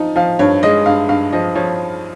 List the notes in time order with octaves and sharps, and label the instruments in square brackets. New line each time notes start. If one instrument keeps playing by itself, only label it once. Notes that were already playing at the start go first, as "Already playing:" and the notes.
Already playing: [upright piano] F3 D#4
F3 F5
G2 C#5
G#3 D#5
G2 F5
G2 F5
F3 D#5
F3 C#5